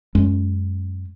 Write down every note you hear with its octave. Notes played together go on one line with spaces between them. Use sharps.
F#2 G#3 C#4